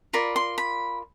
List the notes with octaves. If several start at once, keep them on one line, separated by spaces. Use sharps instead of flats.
F4 A#4 D5 B5
C6
B5